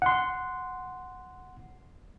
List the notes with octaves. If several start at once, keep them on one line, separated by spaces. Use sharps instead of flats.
F#5 C6